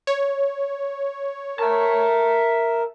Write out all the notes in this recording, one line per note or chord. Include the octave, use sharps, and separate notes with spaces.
C#5
A#4 E5 A5